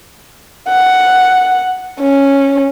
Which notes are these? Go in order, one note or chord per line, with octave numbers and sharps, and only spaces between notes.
F#5
C#4